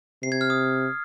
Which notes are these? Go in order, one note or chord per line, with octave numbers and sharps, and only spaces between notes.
C3 C7
G#6
F6
D#6